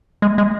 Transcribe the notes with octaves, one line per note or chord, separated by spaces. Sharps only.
G#3
G#3